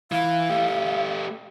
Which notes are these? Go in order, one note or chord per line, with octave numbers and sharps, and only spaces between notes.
E3 F5
A3 G4